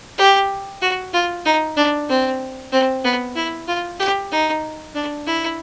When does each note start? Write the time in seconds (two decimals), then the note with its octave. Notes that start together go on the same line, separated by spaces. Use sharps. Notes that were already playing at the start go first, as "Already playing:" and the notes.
0.18 G4
0.82 F#4
1.13 F4
1.45 D#4
1.77 D4
2.09 C4
2.72 C4
3.04 B3
3.36 E4
3.67 F4
3.99 G4
4.31 D#4
4.95 D4
5.26 E4